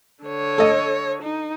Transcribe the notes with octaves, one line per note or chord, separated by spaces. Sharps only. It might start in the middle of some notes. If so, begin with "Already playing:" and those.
D3 C#5
A4 D#5
D#4